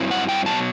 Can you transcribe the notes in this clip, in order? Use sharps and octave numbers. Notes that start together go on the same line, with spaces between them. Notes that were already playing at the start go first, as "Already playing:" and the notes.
Already playing: G2 F#3 C4 E4
F#5
G5
B2 F#3 A5